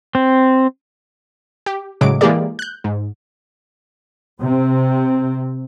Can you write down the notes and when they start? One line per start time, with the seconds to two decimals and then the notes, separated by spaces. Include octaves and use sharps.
0.15 C4
1.66 G4
2.01 A2 C#3 F#3 G#3 D6 D7
2.21 E3 G#3 A#3 G4 G#4 D5
2.59 F#6 G6
2.84 G#2
4.40 C3 C4